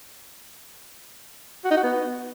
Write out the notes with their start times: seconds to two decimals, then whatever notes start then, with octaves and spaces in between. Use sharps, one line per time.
1.65 F#4
1.71 D#4
1.77 F#4
1.83 B3